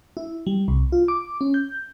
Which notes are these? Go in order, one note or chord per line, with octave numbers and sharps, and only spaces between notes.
E4
G3
C2
F4
D6
C#4
G6